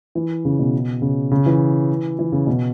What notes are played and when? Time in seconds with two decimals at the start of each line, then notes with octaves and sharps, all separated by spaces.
0.15 E3
0.45 C#3
0.59 B2
1.02 C#3
1.31 C#3
1.46 E3
2.19 E3
2.32 C#3
2.47 B2